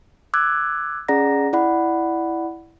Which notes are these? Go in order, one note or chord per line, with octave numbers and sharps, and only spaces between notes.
D6 E6 F#6 G#6
C#4 G#4 D5 F#5 A#5 A#6
E4 D5 F#5 B5